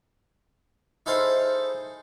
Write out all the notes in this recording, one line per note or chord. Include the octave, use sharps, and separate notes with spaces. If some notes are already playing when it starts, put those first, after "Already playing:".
D#4 E4 G#4 A4 C5 F5